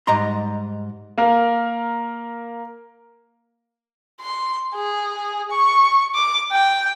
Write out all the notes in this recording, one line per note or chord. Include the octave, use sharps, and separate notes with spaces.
G#2 G3 D#5 A#5 C6
A#3 A#4
C6
G#4
C#6
D6
G5